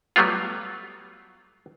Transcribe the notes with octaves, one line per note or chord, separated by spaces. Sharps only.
F#3 G3 A3 B3 F4